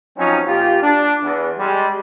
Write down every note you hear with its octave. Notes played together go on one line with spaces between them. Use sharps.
F3 F#3 C4 C#4 D#4
A#2 F4 G4
D4
E2
G3 G#3